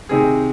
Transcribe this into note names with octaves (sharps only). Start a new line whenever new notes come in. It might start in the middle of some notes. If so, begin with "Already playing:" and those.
C3 D#3 C4 G#4